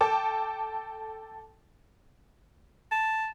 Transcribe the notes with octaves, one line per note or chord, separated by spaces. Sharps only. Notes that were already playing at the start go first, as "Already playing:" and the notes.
A4 G5 A5 D6
A5